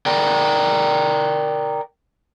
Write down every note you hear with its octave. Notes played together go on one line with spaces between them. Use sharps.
A#4 D5 G5